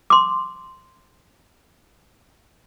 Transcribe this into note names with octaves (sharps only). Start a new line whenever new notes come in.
C6 D6